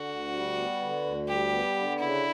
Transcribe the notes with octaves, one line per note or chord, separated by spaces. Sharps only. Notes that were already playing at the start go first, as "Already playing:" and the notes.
Already playing: D3 F#4
D2
G3
B3
D3
D2
G3 G4
B3
D3
C#3 E4